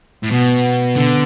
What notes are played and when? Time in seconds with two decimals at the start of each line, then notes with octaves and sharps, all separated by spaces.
0.23 A2
0.32 B2 B3
0.96 D3